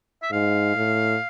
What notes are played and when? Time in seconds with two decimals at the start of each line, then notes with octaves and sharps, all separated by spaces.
0.22 E5
0.31 G#2 F5
0.76 A2